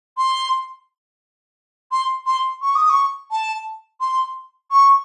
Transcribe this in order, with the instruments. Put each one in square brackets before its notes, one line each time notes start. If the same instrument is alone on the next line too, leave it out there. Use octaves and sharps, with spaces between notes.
[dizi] C6
C6
C6
C#6
D#6
C#6
A5
C6
C#6